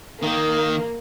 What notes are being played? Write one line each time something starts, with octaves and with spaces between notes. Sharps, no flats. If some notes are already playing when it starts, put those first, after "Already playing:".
D#3 A#3